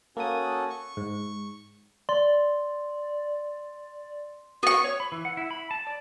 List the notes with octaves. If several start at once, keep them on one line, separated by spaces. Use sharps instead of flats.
A#3 C#4 F#4 A4 D#6
C#6
G#2
D5 C6
B3 F#4 C#6
C#5
B5
E3
F#5
E4
B5
A5
D5